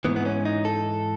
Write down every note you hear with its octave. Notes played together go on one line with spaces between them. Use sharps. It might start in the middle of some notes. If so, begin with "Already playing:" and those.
G#2 E3 B3
B3
C#4
D#4
A4